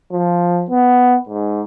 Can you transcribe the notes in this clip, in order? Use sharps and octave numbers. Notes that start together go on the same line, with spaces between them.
F3
B3
G#2